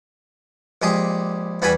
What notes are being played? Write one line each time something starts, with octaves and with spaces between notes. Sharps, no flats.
A#1 G#3 G4 G#4
E2 G3 F#4 D5 G#5 B5